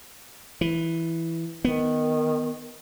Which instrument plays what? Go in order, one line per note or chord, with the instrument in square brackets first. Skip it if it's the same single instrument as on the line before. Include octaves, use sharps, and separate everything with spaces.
[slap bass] E3
[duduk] D#3 [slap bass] B3